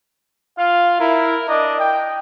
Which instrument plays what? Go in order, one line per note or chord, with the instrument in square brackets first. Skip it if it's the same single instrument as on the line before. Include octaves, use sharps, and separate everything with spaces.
[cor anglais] F4 [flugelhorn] F5
[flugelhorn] E4 [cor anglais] A#4
[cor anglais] D4 [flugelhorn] D#5
[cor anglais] D#5 [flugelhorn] G5